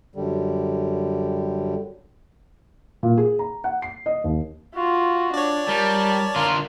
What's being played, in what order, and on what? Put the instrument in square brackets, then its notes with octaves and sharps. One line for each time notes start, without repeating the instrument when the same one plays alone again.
[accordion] F#2 D3 G3
[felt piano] A#2
G#4
A#5
F#5
C7
D#5
D#2
[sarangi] F4 [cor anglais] F#4
[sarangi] D4 [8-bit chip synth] C#5 D5
[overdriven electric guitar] G3 [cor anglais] A#4 [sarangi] A5
[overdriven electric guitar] D3 F4 [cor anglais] A#4